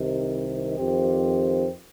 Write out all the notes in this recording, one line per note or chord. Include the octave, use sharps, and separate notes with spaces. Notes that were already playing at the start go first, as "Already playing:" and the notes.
Already playing: C2 C3 D#3
F2 D#3 C4 G4